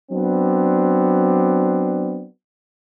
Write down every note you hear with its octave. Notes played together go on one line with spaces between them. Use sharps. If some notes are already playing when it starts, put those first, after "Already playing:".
F#3 B3 C4 D4